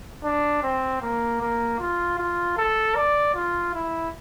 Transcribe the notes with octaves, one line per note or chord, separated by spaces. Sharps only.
D4
C4
A#3
A#3
F4
F4
A4
D5
F4
E4